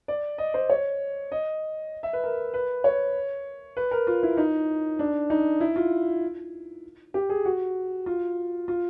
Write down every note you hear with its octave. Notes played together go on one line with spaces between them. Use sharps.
D5
D#5
C5
C#5
D#5
E5
B4
A#4
B4
C#5
B4
A#4
F4
E4
D#4
D4
D#4
E4
F4
G4
G#4
F#4
F4
F4